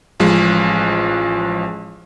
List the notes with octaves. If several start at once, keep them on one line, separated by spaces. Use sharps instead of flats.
A1 F3 G#3